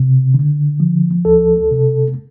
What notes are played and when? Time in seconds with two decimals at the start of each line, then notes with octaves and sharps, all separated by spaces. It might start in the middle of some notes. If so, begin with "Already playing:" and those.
Already playing: C3
0.34 D3
0.80 F3
1.25 D2 A4
1.71 C3